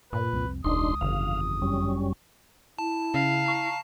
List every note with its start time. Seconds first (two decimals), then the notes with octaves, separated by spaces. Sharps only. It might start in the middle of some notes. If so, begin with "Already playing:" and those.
0.13 G2 A#2 B4
0.33 C2 F2 C4
0.64 E1 C#2 D4 D#4 C6 D#6
1.01 G1 F2 C#3 E3 F5
1.62 F#2 G3 C#4
2.79 E4 A5
3.14 C#3 F5
3.46 A#5 C#6